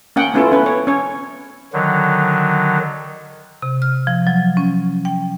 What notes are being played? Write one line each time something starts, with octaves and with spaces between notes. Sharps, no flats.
A#3 C#4 F#5 G5
A3 B3 C#4 E4 F4 A4
C#4 B4
C#5
C#4 C#5
D3 D#3 F#3
C3
F6
F3
F#3
C#4
G5